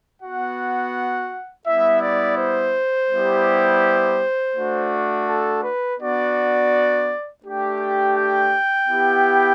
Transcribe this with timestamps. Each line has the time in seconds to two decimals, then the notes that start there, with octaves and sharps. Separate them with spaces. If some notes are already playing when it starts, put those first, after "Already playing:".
0.21 B3 F#4 F#5
1.66 G3 B3 E4 E5
2.02 D5
2.37 C5
3.10 G3 B3 E4 G4
4.54 A3 D4 F#4
5.27 A4
5.63 B4
5.99 B3 D4 F#4 D5
7.43 A3 D4 G4
7.79 G5
8.16 G5
8.88 B3 E4 G4